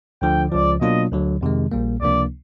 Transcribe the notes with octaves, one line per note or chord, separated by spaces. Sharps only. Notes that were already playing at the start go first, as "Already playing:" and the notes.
D2 D3 F3 G5
C#2 C#3 F3 D5
B2 F#3 A#3 D4 F4 D#5
D2 D3 F#3
F2 C3 D#3 G#3
A#1 A#2 G3 A#3
C#2 C3 F3 A#3 D4 D5